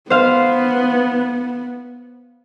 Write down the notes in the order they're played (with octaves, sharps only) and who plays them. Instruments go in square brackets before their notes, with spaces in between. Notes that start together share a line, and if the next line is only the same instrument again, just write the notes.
[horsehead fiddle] B3 [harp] C5 F5